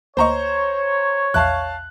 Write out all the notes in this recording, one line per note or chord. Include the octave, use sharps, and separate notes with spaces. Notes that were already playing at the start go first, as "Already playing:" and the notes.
D2 A#3 C5 C#5 D#5 A#5 C#6
A#1 E2 E5 F5 A5 F#6